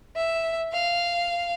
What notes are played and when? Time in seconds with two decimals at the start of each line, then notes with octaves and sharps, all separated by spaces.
0.16 E5
0.73 F5